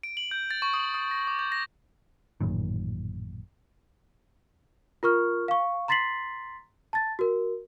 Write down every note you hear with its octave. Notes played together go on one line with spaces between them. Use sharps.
D7
F#7
G6
A6
C#6
D#6
D#6
A#6
D6
G6
A#6
A1 F#2 A#2 D#3
F4 A#4 C#6 F6
F5 C#6
A#5 C6 A6 B6 C7 F#7
A5 A6
F#4 A#4